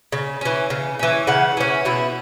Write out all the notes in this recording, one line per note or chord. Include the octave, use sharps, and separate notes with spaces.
C#3
E3 C#4
C#3
E3 C#4
C#3 F#5
E3 C#4
B2 E4